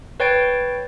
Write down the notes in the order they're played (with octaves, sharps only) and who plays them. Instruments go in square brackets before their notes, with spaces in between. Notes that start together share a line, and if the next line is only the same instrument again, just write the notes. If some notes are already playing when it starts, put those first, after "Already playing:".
[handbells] B4 C#5 G5 A6 D7